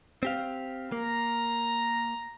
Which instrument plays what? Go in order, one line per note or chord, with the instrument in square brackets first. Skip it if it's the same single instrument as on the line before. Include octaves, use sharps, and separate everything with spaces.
[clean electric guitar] C4 G4 F5
[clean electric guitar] A#3 [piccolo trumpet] A#5